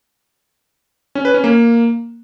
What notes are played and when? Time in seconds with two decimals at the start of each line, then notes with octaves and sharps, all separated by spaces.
1.15 C#4
1.25 B4
1.34 C#4
1.44 A#3